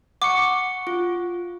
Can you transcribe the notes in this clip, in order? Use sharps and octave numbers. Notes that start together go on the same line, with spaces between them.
F#5 C#6 D6 C#7
F4